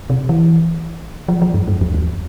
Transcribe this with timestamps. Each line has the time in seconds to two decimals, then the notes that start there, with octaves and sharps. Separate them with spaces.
0.10 C3
0.29 E3
1.29 F3
1.42 F3
1.54 G2
1.68 G2
1.81 F2
1.94 E2